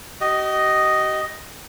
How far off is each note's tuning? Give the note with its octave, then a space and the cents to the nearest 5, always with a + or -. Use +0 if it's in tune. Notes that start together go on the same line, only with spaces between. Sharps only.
G4 -45 D#5 +0